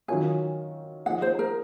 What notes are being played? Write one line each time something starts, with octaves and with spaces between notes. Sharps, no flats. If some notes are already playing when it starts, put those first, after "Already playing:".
D#3 F#3 C#4 F4 A#4 G#5
F3 A#3 D#4 G#4 D#5 F#5
C5
A#4